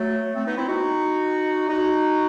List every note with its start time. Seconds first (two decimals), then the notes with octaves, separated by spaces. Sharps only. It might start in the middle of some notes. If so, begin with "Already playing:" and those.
Already playing: F#3 A3
0.35 A3 C4
0.47 B3 D#4
0.58 C4 E4
0.69 D#4 F#4
1.69 D#4 F#4